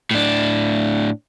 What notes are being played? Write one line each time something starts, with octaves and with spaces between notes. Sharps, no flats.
A2 D4